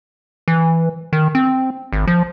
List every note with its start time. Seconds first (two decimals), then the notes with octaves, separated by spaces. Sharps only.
0.48 E3
1.13 D#3
1.35 C4
1.93 G#1
2.08 F3